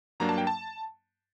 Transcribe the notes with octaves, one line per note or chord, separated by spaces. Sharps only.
G2 F#3 A#3 D4 A#5
A5
G5
A5